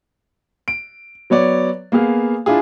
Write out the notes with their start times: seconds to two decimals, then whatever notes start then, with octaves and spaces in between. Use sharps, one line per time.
0.68 D7
1.30 F#3 B3 C#5 D5
1.92 A#3 B3 G#4 F5
2.46 D4 E4 F4 G#4